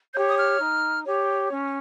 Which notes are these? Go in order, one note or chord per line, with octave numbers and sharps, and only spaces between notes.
G4 C#5 G6
D#6
F6
D#4
G4 C#5
C#4